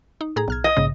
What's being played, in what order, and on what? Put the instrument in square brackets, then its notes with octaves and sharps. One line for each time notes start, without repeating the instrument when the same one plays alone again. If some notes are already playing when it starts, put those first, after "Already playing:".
[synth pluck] D#4
A2 G#4 A#5
B1 F6 G#6
[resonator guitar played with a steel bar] D#5
[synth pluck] A#1 G#2 C#3